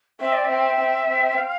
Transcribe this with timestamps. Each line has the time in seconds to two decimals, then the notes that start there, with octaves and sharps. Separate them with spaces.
0.20 C4 E5
0.33 D5
0.45 C4 E5
0.80 C4
1.09 C4
1.38 F5